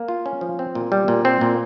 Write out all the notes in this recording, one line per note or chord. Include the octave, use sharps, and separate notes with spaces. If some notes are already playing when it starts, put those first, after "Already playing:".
Already playing: A#3
F4
C#4
F3
C4
A#2
G3
A#2
C4
A#2